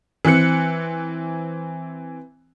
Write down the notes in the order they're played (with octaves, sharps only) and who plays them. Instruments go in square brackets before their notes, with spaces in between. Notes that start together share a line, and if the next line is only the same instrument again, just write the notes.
[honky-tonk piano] E3 C4 F#6 C#7